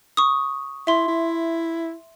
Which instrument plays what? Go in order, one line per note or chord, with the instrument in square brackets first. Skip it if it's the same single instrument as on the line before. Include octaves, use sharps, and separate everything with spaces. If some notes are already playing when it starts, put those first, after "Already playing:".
[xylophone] C#6 D#6
[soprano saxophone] E4 [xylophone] E5 C6
[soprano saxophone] E4